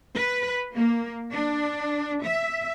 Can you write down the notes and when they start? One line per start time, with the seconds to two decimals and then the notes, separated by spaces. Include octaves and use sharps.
0.15 B4
0.74 A#3
1.32 D4
2.23 E5